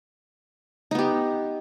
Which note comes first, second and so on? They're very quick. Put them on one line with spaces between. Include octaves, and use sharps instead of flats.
D#4 B3 G4